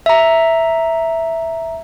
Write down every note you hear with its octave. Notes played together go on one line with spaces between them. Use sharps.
E5 A#5